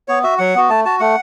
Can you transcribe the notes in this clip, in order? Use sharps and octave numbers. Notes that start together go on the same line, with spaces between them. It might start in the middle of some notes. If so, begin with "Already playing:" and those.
B3 C#5
F#4 E5
F#3 F#5
B3 F#4
A3 A5
F#4 A5
A3 F#5